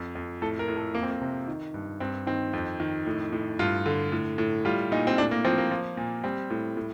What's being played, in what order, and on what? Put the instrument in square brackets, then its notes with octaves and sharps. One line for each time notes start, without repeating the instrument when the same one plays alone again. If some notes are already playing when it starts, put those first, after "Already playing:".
Already playing: [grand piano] F2
F2
A2 A4
A#4
A2
A4
F2 A#3
C4
A#3
C3
D#3
G2
G2 C4
D#3 C4
F2
D#3
A2
A2
G2 F4
D3
A2
A2
G3 F4
A#2 D#4
C4
A2 D4
A#3
F3 C4
A#3
F3
A#2
G3 C4
A2
A2